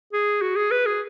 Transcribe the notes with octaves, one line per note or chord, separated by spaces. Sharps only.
G#4
F#4
G#4
B4
G#4